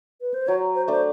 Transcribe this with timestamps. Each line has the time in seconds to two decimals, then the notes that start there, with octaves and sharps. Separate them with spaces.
0.21 B4
0.34 C5
0.48 F#3 C#5
0.75 C5
0.88 A3 D4 C5